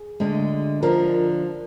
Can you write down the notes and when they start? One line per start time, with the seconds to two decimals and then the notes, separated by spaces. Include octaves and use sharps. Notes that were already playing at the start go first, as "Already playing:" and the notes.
Already playing: G#4
0.20 D2 D3 G#3
0.82 D3 F3 A#4